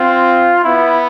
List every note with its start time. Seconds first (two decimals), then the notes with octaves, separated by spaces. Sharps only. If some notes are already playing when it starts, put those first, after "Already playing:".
Already playing: C4 F4
0.64 B3 E4